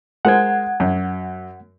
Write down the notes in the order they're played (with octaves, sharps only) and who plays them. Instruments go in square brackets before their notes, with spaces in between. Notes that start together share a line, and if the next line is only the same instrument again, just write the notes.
[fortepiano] G#3 A#4 C5 [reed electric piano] F#5 G#6
[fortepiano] F#2